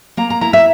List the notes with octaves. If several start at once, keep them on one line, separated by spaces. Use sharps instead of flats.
A#3 A#5
A#5
E4 A#5
E5